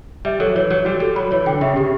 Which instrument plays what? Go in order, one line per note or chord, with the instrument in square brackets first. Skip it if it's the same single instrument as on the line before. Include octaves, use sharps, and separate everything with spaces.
[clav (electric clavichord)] G3 [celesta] E5
[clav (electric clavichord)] F#3 [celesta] A4
[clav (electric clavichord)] E3 [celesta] C#5
[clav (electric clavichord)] F#3 [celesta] C#5
[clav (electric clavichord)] G3 [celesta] F#4
[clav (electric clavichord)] G3 [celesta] A4
[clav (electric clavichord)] F#3 [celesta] B5
[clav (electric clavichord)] E3 [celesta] C#5
[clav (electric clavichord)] D3 [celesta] G5
[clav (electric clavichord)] C#3 [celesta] E5
[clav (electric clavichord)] C#3 [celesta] G4